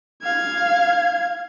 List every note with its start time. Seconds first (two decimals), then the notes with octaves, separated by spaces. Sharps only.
0.23 F5 G#6